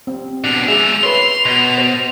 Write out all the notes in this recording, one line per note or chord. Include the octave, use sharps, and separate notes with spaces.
C4
B2 D4 F7
G#3 G#4 E5
B4 C#5 C6
B2
C5